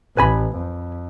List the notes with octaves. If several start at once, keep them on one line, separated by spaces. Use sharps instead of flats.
A1 B4 G#5 B5
F2